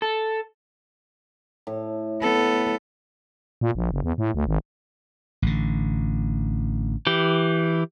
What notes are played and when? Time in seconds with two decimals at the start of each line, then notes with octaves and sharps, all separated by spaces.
0.02 A4
1.67 A2
2.21 B3 A4
3.61 A#2
3.75 A#1
3.92 F#1
4.04 E2
4.18 A2
4.35 D2
4.47 G#1
5.42 A1 D3
7.07 E3 G4